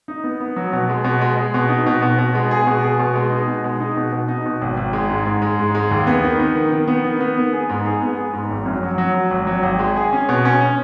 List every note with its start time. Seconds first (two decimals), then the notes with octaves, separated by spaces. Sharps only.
0.08 D#4
0.24 B3
0.40 B3
0.56 F#3
0.73 B2
0.89 G#3
1.04 B2
1.21 G#3
1.37 G#3
1.54 B2
1.69 D#4
1.86 B2
2.02 B2
2.19 B2
2.35 G#3
2.51 G#4
2.67 B2
2.83 G#4
2.99 B2
3.15 G#3
3.32 D#4
3.48 B2
3.64 G#3
3.80 D#4
3.97 B2
4.13 B2
4.28 D#4
4.46 B2
4.62 G#1
4.77 G#1
4.93 G#3
5.10 G#2
5.26 G#2
5.42 G#3
5.59 G#2
5.75 G#3
5.91 D#2
6.07 B3
6.24 D#3
6.40 B3
6.55 D#3
6.72 D#3
6.88 B3
7.05 D#3
7.21 B3
7.37 B3
7.53 G#4
7.69 G#2
7.86 G#4
8.02 B3
8.17 G#4
8.33 G#2
8.50 G#1
8.66 F#2
8.83 F#3
8.98 F#3
9.14 F#3
9.31 G#1
9.47 F#3
9.63 G#1
9.79 G#3
9.96 G#4
10.13 C#4
10.29 B2
10.45 C#4
10.61 C#4